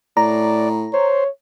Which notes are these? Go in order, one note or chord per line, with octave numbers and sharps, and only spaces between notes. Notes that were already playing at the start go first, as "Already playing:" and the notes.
A2 D5 A#5
C5 C#5